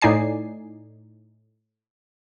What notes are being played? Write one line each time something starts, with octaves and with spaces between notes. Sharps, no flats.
A2 D#4 D5 G#5 C7